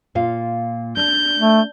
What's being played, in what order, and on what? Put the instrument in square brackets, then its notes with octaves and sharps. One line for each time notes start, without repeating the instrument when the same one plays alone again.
[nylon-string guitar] A#2 F4 F5
[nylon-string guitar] D4 [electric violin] G6
[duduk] A3